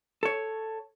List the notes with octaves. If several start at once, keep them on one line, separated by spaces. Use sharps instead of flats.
A4 C#5